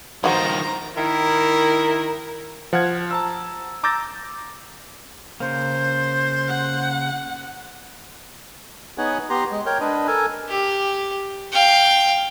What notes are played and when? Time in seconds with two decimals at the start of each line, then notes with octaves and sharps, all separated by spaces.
0.24 D#3 F3 G#3 F#4 C5 A#5
0.97 D#3 E4 A#4
2.73 F3 F#5 F6 G#6
3.11 A5 A#5 E6
3.83 A#5 D6 E6 G6 A6 A#6
5.40 C#3 A#3 C5
6.48 F#5
8.98 B3 D#4 G#4 C#5 F#5
9.30 B3 G4 A#5 C6
9.51 G#3
9.66 A#4 C#5 G5
9.81 D4 B4 D#5
10.07 A4 A#4 G#5
10.49 G4
11.52 F5 G5